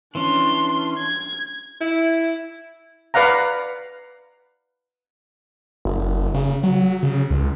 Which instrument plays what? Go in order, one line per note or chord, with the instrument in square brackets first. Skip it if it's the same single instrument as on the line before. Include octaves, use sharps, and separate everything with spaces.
[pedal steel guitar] E3 C#4 [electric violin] D4 C6
[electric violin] G#6
[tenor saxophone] E4
[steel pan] B4 D5 F5 F#5 A#5
[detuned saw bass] F#1
C#3
F#3
C#3
C#2